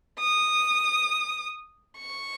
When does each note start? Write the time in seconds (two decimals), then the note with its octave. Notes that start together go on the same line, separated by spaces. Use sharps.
0.20 D#6
1.98 C#6